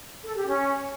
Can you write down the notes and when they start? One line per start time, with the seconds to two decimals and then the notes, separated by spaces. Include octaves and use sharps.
0.24 A4
0.35 G4
0.46 C#4